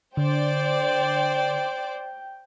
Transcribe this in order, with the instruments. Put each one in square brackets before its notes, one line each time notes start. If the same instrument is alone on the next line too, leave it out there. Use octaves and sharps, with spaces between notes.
[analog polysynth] D3 [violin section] C5 D5 [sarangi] G5